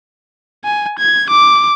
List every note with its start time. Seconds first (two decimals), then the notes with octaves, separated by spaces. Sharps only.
0.64 G#5
0.99 G#6
1.30 D6